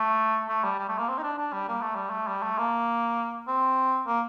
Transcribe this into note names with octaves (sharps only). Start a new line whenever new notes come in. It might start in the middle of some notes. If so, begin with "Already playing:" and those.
Already playing: A3
A3
G3
G3
A3
A#3
C4
D#4
D4
D4
G3
A#3
A3
G3
A3
G3
A3
A#3
C4
A#3